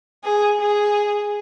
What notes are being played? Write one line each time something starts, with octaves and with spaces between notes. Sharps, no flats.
G#4
G#4